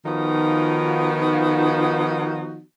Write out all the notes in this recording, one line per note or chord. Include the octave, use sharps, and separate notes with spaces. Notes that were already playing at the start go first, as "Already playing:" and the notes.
D#3 F3 B3 D#4 F4 F#4